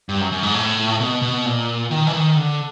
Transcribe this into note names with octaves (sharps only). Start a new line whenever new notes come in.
G2
F#2
F#2
G#2
A2
B2
B2
A#2
D#3
E3
D#3
D3